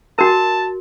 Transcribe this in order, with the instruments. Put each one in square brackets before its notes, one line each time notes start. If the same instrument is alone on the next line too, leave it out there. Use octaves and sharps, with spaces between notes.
[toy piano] F#4 A#4 [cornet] A5